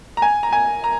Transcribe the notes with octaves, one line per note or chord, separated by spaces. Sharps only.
A#5
G#5
A#5
G#5
A#5